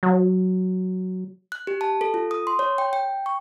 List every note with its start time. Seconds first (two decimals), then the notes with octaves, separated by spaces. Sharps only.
0.03 F#3
1.52 F#6
1.67 G4
1.81 A5
2.01 A4
2.14 F4
2.31 D#6
2.47 C6
2.59 C#5
2.78 G5
2.93 G5
3.26 C#6